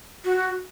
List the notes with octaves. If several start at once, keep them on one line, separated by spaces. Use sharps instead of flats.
F#4